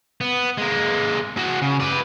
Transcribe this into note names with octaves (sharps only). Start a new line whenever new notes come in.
B3
G#3 A#3
F#4 G#4
C#3
B4 D5